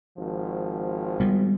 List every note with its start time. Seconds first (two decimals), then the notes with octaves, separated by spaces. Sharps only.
0.17 G#1 F3
1.20 G3 G#3 B3